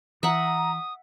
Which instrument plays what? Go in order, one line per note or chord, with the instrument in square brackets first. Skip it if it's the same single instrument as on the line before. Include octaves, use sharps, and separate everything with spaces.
[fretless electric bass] E3 [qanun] E5 F#5 [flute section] A#5 [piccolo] D#6